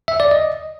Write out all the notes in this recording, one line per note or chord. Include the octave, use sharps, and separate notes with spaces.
E5
D5
D#5